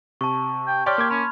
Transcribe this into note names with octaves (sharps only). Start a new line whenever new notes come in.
C3 A5 C#6
G5
G4 C#5 D5 G5 C6 F6
A#3 D6 G#6
C#4 B5